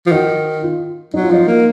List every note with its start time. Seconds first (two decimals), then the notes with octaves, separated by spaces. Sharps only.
0.06 F3
0.12 D#3 F#4
0.63 F4
1.14 F#3 D#4
1.23 F4
1.31 F3 D#4
1.47 A#3